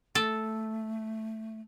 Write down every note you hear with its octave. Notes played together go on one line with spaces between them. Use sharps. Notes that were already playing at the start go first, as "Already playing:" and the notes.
A3 A4